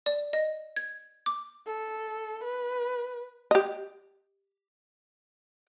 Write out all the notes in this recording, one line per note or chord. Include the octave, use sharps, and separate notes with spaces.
D5
D#5
G#6
D6
A4
B4
G4 D#5